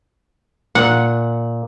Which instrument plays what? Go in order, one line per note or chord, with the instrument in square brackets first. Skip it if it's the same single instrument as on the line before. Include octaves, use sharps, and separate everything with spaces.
[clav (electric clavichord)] A#2 [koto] F#5